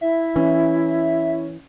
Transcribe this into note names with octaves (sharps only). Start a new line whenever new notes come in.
E4 E5
E3 C#4